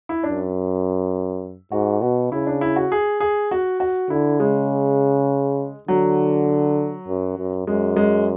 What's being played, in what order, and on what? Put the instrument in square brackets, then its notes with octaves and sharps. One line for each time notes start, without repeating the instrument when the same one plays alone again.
[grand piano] E4
[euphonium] F#2 [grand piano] D4
[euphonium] G#2 [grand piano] F#4
[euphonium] B2 [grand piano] F#4
[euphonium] C#3 [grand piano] E4
[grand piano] D4
E4
F#4
G#4
G#4
F#4
F#4
[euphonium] D3 [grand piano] E4
[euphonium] C#3 [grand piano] G#3
[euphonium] D3 [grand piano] F#3
[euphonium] F#2
F#2
[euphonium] F#2 [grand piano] G#3
[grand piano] G#3